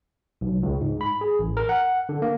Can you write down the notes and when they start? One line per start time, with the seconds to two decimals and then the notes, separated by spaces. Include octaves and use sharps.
0.41 B1
0.63 C#2
0.81 G#2
1.01 B5
1.21 G#4
1.39 A1
1.57 A#4
1.69 F#5
2.09 D3
2.22 A#3